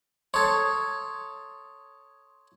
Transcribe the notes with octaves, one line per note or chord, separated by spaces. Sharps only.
A4 C#5 C6 D#6 G#6